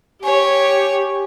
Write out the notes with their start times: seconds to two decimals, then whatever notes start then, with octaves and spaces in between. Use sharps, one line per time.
0.24 G4 C#5 G#5